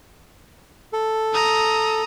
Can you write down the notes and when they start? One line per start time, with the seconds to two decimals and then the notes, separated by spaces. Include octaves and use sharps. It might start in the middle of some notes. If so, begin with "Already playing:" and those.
0.93 A4
1.33 A#5 D#6